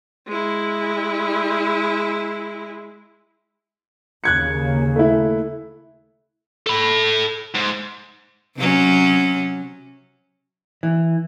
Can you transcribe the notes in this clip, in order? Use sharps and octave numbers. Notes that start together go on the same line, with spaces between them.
G#3 E4
D#2 C#3 A#3 F#6 G#6 C#7
A3 E4
A4 B5
G#2
C3 F#3 C#4
E3